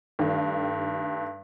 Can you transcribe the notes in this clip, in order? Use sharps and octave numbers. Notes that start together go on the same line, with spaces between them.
G2 D#3 A3 F5